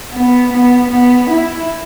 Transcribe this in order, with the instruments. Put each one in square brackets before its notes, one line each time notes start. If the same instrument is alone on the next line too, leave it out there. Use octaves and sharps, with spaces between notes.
[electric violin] B3
B3
B3
E4